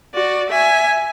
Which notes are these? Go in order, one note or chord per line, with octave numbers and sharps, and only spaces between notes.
F#4 D5
E5 G#5